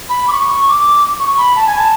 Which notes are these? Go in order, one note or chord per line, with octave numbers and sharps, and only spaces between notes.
B5
D6
C#6
D6
C#6
B5
A5
G#5
A5